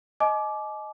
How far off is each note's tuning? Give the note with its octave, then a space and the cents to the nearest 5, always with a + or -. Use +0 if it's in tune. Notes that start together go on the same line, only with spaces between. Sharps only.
D#5 +0 G#5 +45 D6 +0